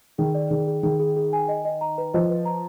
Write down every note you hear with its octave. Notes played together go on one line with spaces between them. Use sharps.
D#3 G#4
D5
D#3 G#4
G#4
D#3 G#4
G#4
G#4
G#5
D#5
D#5
A#5
B4
F3 D#5
B4
A#5